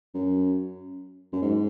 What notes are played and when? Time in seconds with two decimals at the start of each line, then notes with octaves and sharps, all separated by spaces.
0.14 F#2
1.33 F#2
1.42 G#2